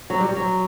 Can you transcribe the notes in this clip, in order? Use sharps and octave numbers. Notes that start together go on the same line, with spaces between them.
F#3
G3
F#3